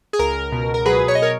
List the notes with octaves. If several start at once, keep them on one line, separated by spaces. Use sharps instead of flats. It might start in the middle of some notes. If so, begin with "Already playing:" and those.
G#4
C#2 A#4
B2
A#4
F#3 G#4 B4
C#5
D#5
A#4 C#5